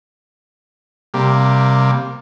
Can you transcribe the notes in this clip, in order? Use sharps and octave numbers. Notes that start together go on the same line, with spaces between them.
C3 G3 A#3